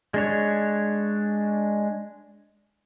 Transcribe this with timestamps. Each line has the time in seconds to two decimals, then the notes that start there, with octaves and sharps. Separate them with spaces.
0.14 G#3 D4 C#5